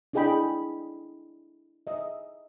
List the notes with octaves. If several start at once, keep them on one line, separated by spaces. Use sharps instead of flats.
D4 E4 G#4 D#5 G5 B5
D#5 E5